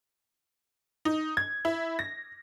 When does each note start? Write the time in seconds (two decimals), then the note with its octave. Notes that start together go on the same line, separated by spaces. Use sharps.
1.05 D#4
1.37 G#6
1.65 E4
1.99 A#6